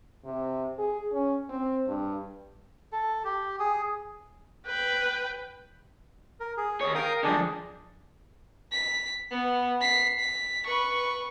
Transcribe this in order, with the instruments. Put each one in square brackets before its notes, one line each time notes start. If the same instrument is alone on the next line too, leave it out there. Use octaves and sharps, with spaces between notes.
[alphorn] C3
G#4
C#4
C4
G2
[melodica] A4
G4
G#4
[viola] B4 G5
[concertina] A#4
G#4
[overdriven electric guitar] D#2 C#5
[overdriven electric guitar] A#4 [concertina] F5 G5 D#6
[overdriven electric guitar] D3 F3 [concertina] D4 G#4 D5
[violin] B6
B3
B6 C7
B6
B4 C#6